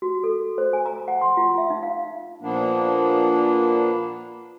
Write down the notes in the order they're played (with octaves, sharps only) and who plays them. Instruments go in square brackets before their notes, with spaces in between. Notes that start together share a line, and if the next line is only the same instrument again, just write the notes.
[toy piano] F#4
A4
C5
G#5
A#5
F#5
C6
F4
E5
D#4
F5
[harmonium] A#2 F3 A#3 B3 D4